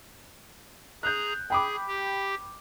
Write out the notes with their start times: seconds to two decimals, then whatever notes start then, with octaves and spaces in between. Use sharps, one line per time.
1.03 G#4 A#5 F#6 G6
1.50 G#4 G5 B5 D6
1.87 G4